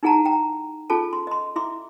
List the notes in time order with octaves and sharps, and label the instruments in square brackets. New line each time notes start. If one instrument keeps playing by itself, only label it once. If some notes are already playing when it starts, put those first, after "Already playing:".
[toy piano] D#4 E4 G#4 F#5 A5 A#5
G5 A#5
C#4 F4 G#4 A4 A5
C6
D#5 C6
E4 E5 C6 D6